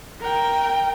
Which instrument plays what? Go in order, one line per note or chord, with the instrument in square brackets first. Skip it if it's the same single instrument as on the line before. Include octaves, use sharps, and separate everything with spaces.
[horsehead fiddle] A#4 G5